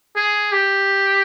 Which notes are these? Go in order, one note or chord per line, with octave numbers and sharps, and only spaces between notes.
G#4
G4